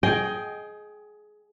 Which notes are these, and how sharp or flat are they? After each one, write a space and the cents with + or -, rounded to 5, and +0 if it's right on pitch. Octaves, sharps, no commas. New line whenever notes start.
G#4 +20 D#5 +0 G5 +0